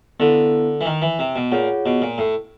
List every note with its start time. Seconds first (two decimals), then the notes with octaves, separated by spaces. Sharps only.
0.20 D3 B3 E4 A4
0.81 E3
0.85 D#3
1.02 E3
1.19 C3
1.36 B2
1.52 A#2 F4 G#4 C#5 F#5
1.86 B2
2.02 A#2
2.18 A2